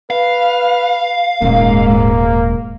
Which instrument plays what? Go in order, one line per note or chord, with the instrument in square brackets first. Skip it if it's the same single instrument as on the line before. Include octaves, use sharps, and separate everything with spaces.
[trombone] B4 [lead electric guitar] F5
[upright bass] D#1 [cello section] G#2 [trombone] A#3